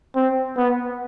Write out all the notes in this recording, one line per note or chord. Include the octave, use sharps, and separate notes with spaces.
C4
B3